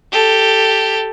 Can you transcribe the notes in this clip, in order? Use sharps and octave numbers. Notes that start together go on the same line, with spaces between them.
G4 A4